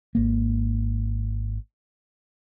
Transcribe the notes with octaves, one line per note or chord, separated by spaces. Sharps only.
G#1 A#3